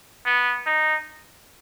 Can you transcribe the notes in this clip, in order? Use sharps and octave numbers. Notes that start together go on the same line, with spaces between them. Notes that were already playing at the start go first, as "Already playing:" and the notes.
B3
D#4